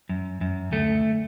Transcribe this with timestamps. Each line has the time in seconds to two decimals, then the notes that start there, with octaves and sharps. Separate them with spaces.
0.09 F#2
0.41 F#2
0.72 D2 A3